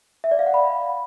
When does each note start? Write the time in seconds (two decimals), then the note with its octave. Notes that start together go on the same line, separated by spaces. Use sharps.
0.24 E5
0.31 D5
0.39 F5
0.46 F#5
0.54 B5